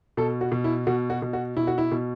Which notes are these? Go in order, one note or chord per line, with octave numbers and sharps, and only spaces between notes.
B2 A4
F#4
B2
E4
B2 F#4
F#4
B2
F#4
B2 E4
F#4
E4
B2